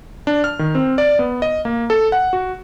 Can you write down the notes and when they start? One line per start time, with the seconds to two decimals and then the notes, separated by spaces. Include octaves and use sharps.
0.27 D4
0.44 F6
0.59 D#3
0.75 C4
0.98 D5
1.19 B3
1.42 D#5
1.65 A#3
1.90 A4
2.12 F#5
2.33 F#4